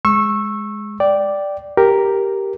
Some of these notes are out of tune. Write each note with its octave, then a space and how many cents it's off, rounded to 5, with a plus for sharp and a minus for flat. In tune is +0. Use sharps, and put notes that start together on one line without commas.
G#3 +0 C#6 -20 E6 +0
D5 +0 G5 -15
G4 +0 A#4 +0